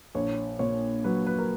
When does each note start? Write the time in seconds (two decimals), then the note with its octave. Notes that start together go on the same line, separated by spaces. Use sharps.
0.15 A#1 C#5
0.59 A#2 C#5
1.04 F#3 B4
1.27 B4
1.38 A#4